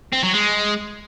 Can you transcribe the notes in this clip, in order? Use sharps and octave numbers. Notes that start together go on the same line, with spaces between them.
C4
F#3
G#3